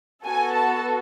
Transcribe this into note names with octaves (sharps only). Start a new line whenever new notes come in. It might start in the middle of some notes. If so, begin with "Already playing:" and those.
B3 F#4 A4 G#5
A5